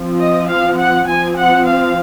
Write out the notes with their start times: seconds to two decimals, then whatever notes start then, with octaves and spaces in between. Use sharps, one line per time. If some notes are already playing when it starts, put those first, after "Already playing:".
Already playing: F3 C4
0.20 D#5
0.49 F5
0.78 F#5
1.08 F3 C4 G#5
1.37 F#5
1.67 F5